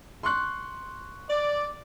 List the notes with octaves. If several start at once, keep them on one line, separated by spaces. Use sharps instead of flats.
C6 C#6 F#6
D5